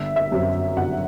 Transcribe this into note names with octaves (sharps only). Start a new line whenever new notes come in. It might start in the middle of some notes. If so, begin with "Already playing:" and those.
Already playing: G1 E5
E5
F#2 F#3 C4
G1 F#5